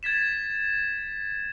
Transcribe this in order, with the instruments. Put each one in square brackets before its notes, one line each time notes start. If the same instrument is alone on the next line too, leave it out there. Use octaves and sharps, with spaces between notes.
[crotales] G#6 A6 B6 E7